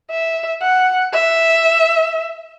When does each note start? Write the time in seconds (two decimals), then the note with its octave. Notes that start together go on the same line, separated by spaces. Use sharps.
0.11 E5
0.62 F#5
1.13 E5